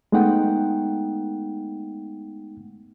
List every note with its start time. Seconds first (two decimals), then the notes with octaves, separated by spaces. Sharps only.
0.12 G#3 A3 B3 D#4 F#5 G5